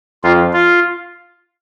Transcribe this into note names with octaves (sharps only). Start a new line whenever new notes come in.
F2 F4
F4